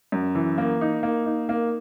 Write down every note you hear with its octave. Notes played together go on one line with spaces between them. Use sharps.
F#2
E3
A#3
D#4
A#3
D#4
A#3